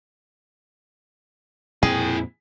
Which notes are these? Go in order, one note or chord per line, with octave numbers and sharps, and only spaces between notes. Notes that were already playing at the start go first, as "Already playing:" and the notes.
F2 A#2 C4 E4 G#4 G5